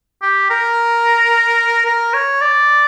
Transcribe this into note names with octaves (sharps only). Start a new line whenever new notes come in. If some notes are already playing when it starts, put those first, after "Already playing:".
G4
A#4
A#4
C#5
D5